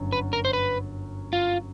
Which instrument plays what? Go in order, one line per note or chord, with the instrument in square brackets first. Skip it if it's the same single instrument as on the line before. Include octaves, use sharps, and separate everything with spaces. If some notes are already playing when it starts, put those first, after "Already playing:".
Already playing: [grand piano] G1 F#2
[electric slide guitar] B4
A#4
C5
B4
F4